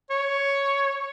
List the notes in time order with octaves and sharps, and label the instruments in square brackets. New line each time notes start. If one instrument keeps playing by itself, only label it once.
[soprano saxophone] C#5